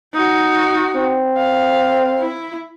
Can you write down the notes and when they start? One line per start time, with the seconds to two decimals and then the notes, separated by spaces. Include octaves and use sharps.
0.13 D#4 F#4
0.96 C4
1.37 F5
2.19 E4